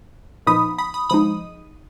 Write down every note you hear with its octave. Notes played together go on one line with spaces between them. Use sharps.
A#2 F3 B3 D#4 B5 D#6
B5 D#6
B5 D#6
F3 G#3 D#4 B5 D#6